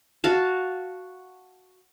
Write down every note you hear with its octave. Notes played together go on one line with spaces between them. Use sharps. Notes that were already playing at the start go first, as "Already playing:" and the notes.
F#4 F5 A5